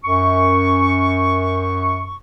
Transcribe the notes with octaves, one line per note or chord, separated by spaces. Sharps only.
F#2 C#6